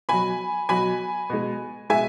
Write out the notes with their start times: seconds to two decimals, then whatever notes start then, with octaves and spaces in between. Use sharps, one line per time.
0.09 B2 F#3 G#5 B5
0.69 B2 F#3 G#5 B5
1.30 B2 G#3
1.90 B2 G#3 E5 G#5